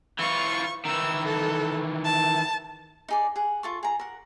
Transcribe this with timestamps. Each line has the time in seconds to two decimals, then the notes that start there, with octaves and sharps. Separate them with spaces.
0.19 E3 F4 C#6
0.85 D#3 E3 E6
1.25 A4
2.04 A5
3.08 D#4 G#4 D5
3.36 G#4 F#5
3.63 F4 A4 C#6
3.83 G#4 A#5
4.00 A#4 F#5